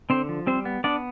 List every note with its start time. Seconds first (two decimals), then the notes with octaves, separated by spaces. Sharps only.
0.10 D3 C4 C5
0.29 F3
0.47 G3 C4 C5
0.65 B3
0.84 B3 D4 D5